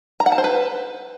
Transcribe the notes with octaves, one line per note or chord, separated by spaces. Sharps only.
A#5
F#5
A5
C5
B4